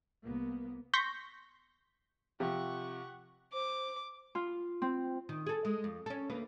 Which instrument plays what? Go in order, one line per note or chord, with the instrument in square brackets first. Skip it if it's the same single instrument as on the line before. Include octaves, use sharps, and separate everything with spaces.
[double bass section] C2 A#3 B3
[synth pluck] C6 C#6 G6 A#6 B6
[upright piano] C3 F3 [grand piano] G4 [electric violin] F#5 C#6
[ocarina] C5 [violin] D6
[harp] F4
C4
[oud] D#3
G#4 A4
G#3
F2
C#4 A4
D2 A#3 B4